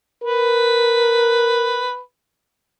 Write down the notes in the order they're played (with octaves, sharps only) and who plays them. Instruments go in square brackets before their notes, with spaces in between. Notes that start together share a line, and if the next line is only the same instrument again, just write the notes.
[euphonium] A#4 [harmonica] B4